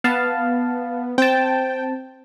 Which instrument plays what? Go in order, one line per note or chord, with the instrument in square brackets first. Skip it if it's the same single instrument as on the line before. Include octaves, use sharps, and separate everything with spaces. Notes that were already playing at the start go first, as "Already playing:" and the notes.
[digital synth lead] B3 [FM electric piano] F5 A5
[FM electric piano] C4 A5 [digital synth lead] G5